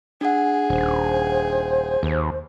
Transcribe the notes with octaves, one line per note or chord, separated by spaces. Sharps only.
D4 G#4 F#5
D#1 C5
D#2